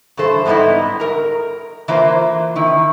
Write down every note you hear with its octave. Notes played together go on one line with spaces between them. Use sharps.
G2 E3 A4 C5
G#2 G3 B3 C#4 D#4 E4
A#4 A#5
E3 A#3 F4 C5
D#3 E4